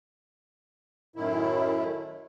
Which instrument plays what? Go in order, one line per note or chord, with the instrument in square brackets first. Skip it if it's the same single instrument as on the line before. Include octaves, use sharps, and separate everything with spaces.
[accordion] F#2 A2 D#3 E4